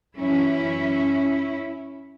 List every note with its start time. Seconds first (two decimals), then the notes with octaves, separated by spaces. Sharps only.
0.17 F#2 E3 C#4 E4